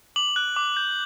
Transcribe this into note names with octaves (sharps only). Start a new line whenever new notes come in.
D6 F#7
F#6
D6
G6